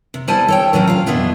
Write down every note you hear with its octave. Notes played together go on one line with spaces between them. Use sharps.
C3
G3 B3 E4 C5 G#5 A5
A4 C#5 G5
A2 C3 F#3 A3 C#4
F4 F5
F2 B2 B3 D4 E4 F4